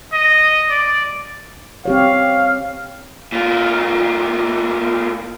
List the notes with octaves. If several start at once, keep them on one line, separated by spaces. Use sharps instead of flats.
D#5
D5
C4 G4 C#5 F5
A2 F4